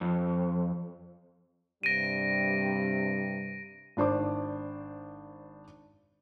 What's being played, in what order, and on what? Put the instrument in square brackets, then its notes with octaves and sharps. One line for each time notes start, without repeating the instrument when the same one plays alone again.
[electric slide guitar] F2
[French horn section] G2 C3 G3 [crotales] A#6 D7 D#7
[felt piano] G#1 D4 C5 D6